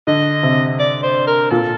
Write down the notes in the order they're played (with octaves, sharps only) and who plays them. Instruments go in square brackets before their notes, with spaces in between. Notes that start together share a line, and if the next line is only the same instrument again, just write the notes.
[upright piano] D3 [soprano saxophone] D#5
[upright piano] C3
[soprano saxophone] D5
C5
A#4
[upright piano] A#2 [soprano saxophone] A4